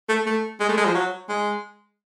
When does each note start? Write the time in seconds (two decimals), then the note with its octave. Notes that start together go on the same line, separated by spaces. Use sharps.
0.09 A3
0.26 A3
0.60 G#3
0.69 A3
0.77 G#3
0.86 F3
0.94 F#3
1.29 G#3